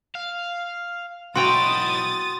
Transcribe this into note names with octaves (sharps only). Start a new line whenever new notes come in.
F5
B1 E4 F#4 G5 A#5 C6 D#6 A6